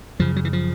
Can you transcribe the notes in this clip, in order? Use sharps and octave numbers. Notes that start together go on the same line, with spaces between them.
F#2 C#3 F3
F#3
E3
F3